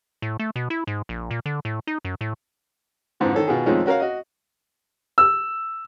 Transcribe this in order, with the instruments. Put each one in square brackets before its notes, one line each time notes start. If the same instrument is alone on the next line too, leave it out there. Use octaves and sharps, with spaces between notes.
[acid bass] A2
A3
B2
E4
G#2
A#1
A#2
D3
A2
D#4
F#2
A2
[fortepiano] F2 G#2 D3 E3
D#3 A4 C#5
B2 D#3 F4 G#4
F2 D#3 F3 G#3 A3 C#4
C#4 F#4 A#4 C#5 F5
F#4 D#5
[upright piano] E6